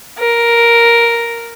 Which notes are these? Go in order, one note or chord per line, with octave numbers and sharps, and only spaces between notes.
A#4